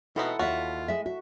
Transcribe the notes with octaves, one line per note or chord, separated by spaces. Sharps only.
B2 E3 C4 D#4 E4 A4 F#5
D#2 F4 F#4 C#5 E5
G#3 E5
F#4 E5